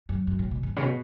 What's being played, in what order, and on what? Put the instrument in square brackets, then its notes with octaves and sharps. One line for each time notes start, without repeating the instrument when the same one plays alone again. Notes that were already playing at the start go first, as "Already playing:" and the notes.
[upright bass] F#2
F#2
A2
B2
G#2
C#3
B2